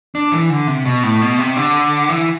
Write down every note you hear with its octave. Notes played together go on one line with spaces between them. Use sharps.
D4
E3
D3
C3
B2
A2
B2
C3
D3
E3